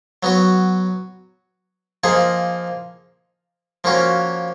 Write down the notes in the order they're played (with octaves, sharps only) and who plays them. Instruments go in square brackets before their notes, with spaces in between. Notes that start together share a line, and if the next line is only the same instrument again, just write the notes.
[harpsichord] F#3 B3 F#4
F3 A#3 D#4 G#4
F3 A#3 C#4 F#4